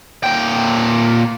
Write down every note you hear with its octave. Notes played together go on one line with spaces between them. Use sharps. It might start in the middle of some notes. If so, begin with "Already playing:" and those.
A#2 G5